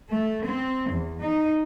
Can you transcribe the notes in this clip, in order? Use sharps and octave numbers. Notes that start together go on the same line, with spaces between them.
A3
C4
E2
D#4